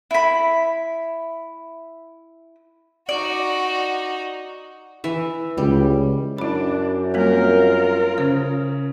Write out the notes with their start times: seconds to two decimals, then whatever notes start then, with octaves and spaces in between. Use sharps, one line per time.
0.11 E4 B5
3.09 D#4 F#4 D5
5.04 E3 E5
5.58 C#2 G3
6.38 F#2 D4 E4 B5
7.14 G3 A#3 C4 F4 A#4
8.18 C#3 C5